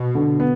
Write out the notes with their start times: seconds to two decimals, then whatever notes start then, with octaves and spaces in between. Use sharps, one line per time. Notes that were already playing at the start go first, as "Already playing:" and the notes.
Already playing: B2
0.15 D3
0.40 B3